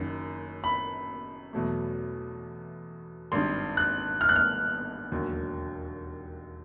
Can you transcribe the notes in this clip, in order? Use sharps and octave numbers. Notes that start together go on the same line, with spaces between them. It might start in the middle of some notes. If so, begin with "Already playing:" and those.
Already playing: F#1 F#2 D#3
B5
E2 B2 F#3 A3
G#1 G2 D#3 C6
F#6
F6
F#6
F6
E1 D#2 D3 F#3